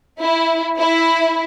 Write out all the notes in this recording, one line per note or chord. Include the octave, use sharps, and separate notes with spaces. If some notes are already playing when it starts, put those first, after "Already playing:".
E4
E4